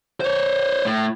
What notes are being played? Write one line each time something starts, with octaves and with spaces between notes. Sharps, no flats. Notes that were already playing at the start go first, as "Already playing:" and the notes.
C5 C#5
A2